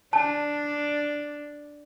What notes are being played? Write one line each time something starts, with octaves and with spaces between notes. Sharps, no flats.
D4 A5